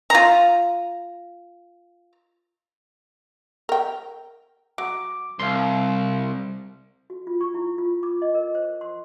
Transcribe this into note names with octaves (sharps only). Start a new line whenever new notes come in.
F4 A#5
A#4 G5
F#3 D6
C2 F5 C6
F#4
F4
C#6
E4
F4
D6
D#5
A#4
C5
C6